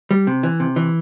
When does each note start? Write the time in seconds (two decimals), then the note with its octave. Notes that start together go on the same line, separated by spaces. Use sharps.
0.11 G3
0.27 C3
0.43 E3
0.60 C3
0.76 E3